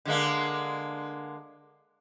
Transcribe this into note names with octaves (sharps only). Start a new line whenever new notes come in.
D3 G#3 A#3